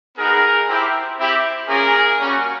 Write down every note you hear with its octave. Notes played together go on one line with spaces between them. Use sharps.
B3 D#4 F#4 G#4 A#4
C4 E4 G4
C4 E4 G4
A#3 C#4 F4 G#4 A#4
G3 A#3 C#4 F#4